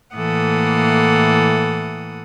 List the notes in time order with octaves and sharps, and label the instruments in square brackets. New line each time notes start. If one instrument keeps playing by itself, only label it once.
[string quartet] A2 E3 A#3 A4 F#5 D#6